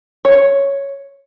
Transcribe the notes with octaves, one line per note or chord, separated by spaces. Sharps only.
C#5